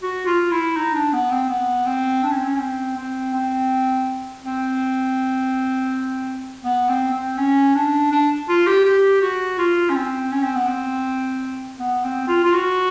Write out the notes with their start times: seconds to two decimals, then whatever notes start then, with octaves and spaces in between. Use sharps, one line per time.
0.03 F#4
0.27 F4
0.51 E4
0.77 D#4
0.94 D4
1.13 B3
1.31 C4
1.49 B3
1.86 C4
2.23 D4
2.31 C#4
2.37 C4
2.45 C#4
2.55 C#4
2.60 C4
2.97 C4
3.34 C4
4.44 C4
6.64 B3
6.89 C4
7.14 C4
7.38 C#4
7.75 D4
8.12 D4
8.49 F4
8.67 G4
8.85 G4
9.22 F#4
9.59 F4
9.90 C#4
9.96 C4
10.32 C#4
10.44 C4
10.55 B3
10.67 C4
11.79 B3
12.04 C4
12.28 F4
12.44 F4
12.53 F#4